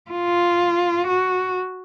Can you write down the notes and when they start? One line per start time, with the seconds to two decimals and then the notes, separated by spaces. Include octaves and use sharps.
0.11 F4
1.08 F#4